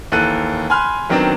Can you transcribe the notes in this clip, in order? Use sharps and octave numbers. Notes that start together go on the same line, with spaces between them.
D#2 E3 A4 F#6 D#7
G#5 B5 C6 F6 F#6
D#3 F#3 B3 C4 D4